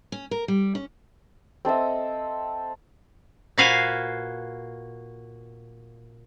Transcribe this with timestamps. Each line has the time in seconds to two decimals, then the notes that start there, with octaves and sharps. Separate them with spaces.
0.12 C#4
0.31 A#4
0.48 G3
0.75 C#4
1.65 C4 A4 D#5 E5
3.58 A#2 F#4 B4 C5 F5 G#5